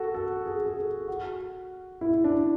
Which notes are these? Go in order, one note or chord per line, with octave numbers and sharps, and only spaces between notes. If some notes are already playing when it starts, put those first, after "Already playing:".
Already playing: F#4 A4
A4
G#4
G#4
A4
F#4
E4
D4